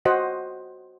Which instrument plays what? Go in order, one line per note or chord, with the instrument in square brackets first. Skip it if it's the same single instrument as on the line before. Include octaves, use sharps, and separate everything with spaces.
[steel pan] F#4 C5 D#5 F#5